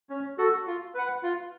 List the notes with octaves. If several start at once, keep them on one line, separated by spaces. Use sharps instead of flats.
C#4
F#4 A4
F4
B4 F#5
F4